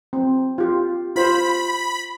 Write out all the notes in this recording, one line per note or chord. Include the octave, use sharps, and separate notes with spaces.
C4
F4 G4
F4 C5 B5